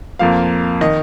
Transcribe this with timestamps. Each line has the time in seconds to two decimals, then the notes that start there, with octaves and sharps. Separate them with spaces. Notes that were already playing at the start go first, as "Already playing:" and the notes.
0.19 F2 F3 A#3 F5
0.81 D#3 D#5